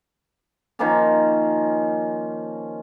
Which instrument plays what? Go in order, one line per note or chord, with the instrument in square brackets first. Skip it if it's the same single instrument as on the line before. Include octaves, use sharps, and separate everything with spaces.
[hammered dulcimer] D#3 F3 A#3 C#4